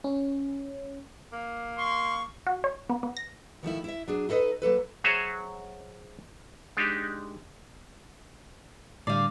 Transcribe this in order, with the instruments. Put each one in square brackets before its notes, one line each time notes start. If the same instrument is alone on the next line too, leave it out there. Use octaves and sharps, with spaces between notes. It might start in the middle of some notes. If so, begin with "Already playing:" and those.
[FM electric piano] C#4
[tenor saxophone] A#3
[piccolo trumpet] C6 [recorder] C#6
[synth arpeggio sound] F#4
C#5
B3
B3
A#6
[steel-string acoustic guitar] D#3 F3 A3 E4
E4 E5
F#3 D4 G#4
D#4 E4 A4 B4 D#5
F#3 A#3 A4 B4
[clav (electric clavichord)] F#3 F#4 G#4 C5 C#5 E5
G#3 D4 D#4 G4
[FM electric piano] A2 D3 G3 [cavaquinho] D5 F5